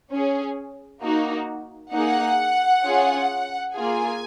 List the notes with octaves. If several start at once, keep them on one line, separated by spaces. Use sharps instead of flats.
C#4 G#4
A#3 D#4 F#4
A#3 D#4 G#4 F#5
C#4 F4 G#4
A#3 F4 G#4 G#5